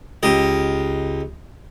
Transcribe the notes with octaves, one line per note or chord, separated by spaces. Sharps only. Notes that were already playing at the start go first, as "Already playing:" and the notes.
C#2 G4 D#5